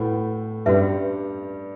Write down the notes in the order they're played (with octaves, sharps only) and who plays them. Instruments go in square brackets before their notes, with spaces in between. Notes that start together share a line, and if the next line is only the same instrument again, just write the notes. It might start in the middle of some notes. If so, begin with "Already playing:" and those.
Already playing: [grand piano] A2 A3 [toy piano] F#4 B4 F#5 B5
[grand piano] G2 G3 [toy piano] C#4 F#4 B4 E5